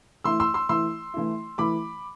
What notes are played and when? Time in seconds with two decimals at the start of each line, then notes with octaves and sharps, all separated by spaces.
0.24 E3 A3 E4 C6 E6
0.40 C6 E6
0.54 C6 E6
0.69 E3 A3 E4 C6 E6
1.14 E3 A3 E4
1.58 E3 A3 E4 B5 D6